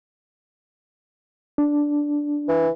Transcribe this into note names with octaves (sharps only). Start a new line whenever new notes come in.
D4
E3